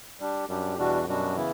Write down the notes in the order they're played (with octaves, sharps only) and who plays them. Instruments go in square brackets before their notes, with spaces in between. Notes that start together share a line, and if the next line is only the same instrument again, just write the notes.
[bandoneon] G3 D4 G4
[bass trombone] F#2 [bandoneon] G3 D4 G4
[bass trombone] E2 [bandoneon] B2 G3 D4 F#4
[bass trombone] F#2 [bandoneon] B2 G3 D4 F#4
[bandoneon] C#3 E3 B3 E4